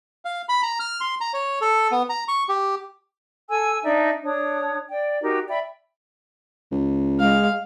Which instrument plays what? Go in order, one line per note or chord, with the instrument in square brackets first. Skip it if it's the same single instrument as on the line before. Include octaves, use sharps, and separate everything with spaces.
[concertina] F5
B5
A#5
F6
C6
A#5
C#5
A4
B3
A#5
C#6
G4
[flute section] A4 G#5 E6
D4 D#4 D5 E5
D4 C#5 D#6
D5 G5
D#4 F#4 G4 A#4
D5 E5 G5 B5
[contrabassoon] C#2
[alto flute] G#3 [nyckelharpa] F5